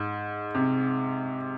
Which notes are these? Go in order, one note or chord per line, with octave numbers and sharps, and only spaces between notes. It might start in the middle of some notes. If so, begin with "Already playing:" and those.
Already playing: G#2
C3